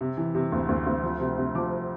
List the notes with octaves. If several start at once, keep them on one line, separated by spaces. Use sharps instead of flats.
C3
E3
C3
D2
D2
D2
F3
C3
C3
F3 D6